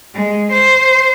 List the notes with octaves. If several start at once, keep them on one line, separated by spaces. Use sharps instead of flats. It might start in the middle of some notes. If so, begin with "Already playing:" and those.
G#3
C5